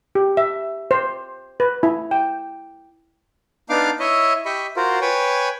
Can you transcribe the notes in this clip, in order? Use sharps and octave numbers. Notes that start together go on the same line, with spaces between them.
G4
E5
C5
B4
E4
G5
B3 D4 D#4 F5 D6 F6
E4 C#5 D#5 E5
G4 D#5 E5 B5 C#6
F4 F#4 A#4 C5
B4 C#5 G5 G#5